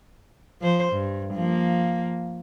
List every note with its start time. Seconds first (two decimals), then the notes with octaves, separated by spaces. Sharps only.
0.61 F3 C5
0.93 G2
1.34 F3 A#3